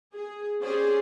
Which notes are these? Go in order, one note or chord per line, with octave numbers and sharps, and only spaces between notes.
G#4
C#4 G4 G#4 C5 D5